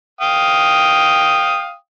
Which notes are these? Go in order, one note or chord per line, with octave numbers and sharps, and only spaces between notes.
F5 G5 D#6